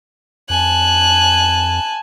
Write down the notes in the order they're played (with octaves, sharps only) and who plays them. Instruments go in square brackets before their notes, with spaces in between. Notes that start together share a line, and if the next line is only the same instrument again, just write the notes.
[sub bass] F2 [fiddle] G#5 A5 [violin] F#6